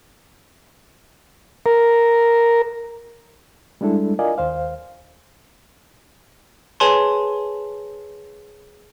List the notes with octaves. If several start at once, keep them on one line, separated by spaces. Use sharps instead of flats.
A#4
G3 G#3 D4 E4 A4
F4 A#4 D5 D#5 F5 G#5
D#2 C5 F5
G#4 B4 C#5 G#5 A5 C6